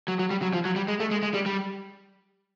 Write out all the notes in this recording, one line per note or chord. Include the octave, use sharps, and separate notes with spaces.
F#3
F#3
G3
F#3
F3
F#3
G3
G#3
A3
G#3
G#3
G3
G3